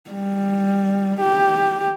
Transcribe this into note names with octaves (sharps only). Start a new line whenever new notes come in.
G3
G4